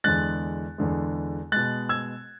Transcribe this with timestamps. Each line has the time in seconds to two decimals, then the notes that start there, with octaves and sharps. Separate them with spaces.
0.04 E2 D3 G#3 F#6 A6
0.78 E2 D3 G#3
1.52 B2 G#3 F#6 A6
1.89 E6 G#6